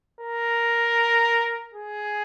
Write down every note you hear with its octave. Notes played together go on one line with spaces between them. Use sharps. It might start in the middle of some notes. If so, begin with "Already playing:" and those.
A#4
G#4